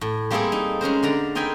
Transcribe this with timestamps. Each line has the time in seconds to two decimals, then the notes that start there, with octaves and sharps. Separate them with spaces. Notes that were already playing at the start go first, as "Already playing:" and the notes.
0.01 A2
0.31 G3 A#3 C4 E4 G#4 A4
0.52 D#4
0.81 G#3 C#4 A#4 C5
1.03 D3 D5 A#5
1.35 C4 D#4 A#4 G5 G#5 B5